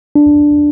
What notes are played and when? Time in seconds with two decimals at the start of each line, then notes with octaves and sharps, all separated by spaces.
0.16 D4